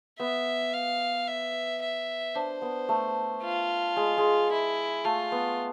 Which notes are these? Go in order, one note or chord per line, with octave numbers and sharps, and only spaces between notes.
B3 E5
F5
E5
E5
D4 C5
B3
A3
F4
G#3
G#3
E4
A3 F4
B3